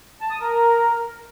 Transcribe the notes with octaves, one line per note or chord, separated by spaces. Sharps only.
A5
D#6
A#4